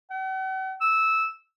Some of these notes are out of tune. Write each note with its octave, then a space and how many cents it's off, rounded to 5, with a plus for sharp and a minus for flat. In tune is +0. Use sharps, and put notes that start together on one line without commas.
F#5 +45
E6 -10